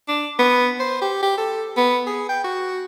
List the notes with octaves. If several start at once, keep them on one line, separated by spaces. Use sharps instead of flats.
D4
B3
C5
G4
G4
A4
B3
G#4
G5
F#4